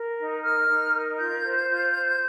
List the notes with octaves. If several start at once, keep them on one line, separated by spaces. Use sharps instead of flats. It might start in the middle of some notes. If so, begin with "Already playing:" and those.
Already playing: A#4
D#4
A#4 F6
D#4
A#4
F4 G6
C5
F4
C5